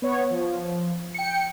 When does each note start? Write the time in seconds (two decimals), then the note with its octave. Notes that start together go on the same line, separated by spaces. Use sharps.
0.02 B3 C#5
0.31 F3
1.14 G5 C#7